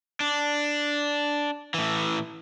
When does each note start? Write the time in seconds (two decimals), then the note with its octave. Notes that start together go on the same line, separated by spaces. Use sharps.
0.20 D4
1.74 A2 E3